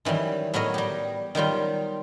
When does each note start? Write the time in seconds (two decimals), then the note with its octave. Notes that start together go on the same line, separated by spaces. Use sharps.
0.05 D#3 E3 F#3 G3
0.54 A2 F#3 B3 A#4 C#5 D#5
0.74 G3 G4
1.35 D#3 F#3 G3 F4